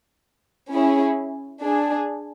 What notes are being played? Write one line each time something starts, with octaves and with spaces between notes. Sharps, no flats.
C#4 E4 G#4
D4 G#4